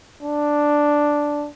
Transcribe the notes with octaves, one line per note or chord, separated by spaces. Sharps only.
D4